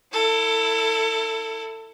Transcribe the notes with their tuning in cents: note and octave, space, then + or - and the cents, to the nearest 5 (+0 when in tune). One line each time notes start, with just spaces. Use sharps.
E4 +0 A4 +30